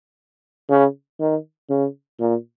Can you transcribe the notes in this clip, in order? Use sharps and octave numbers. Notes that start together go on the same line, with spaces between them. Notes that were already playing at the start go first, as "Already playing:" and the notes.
C#3
D#3
C#3
A#2